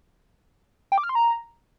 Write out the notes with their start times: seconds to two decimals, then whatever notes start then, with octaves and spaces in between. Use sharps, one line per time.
0.92 G5
0.98 D6
1.04 F6
1.09 C6
1.15 A#5